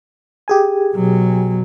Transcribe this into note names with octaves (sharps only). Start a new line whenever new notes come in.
G4 G#4 G#5
B2 F#3